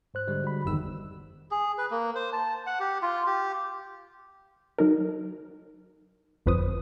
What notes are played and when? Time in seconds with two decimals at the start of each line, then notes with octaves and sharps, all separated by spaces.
0.14 G#2 C5 F#6
0.28 D3 G3 G#3
0.44 F#4 B5
0.65 G1 E2 D#3 G3 E6
1.51 G#4
1.78 B4
1.91 A#3
2.15 C5
2.33 A5
2.67 F#5
2.80 G4
3.02 F4
3.27 G4
4.79 F#3 D#4 A4 A#4
6.46 G1 F2 B4 C5 D#6